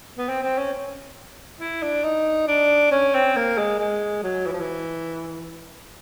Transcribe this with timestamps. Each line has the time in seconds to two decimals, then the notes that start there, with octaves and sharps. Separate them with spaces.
0.18 B3
0.29 C4
0.43 C4
0.58 C#4
1.60 E4
1.82 D4
2.03 D#4
2.47 D4
2.91 C#4
3.14 C4
3.36 A#3
3.58 G#3
3.79 G#3
4.23 F#3
4.46 E3
4.52 F3
4.60 E3